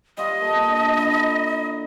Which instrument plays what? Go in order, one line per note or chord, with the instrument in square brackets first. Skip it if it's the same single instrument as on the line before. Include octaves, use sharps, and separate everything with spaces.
[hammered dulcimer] G3 F4 E5 [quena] D#5
[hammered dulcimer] A#3 A4
D4
D3 D#4 E4